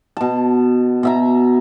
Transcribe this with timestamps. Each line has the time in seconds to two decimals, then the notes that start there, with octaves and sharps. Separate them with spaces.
0.17 B2 A5
1.03 B2 E5 A#5